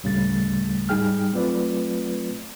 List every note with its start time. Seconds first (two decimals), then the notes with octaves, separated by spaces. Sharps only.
0.04 D2 A2 C#3 G3 A3 A6
0.89 G#2 G3 D#4 G#4 G5 F6
1.32 F#3 A3 C4 F4 B4 D5